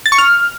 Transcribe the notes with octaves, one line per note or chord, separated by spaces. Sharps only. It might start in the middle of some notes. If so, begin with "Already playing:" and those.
A6
C#6
F6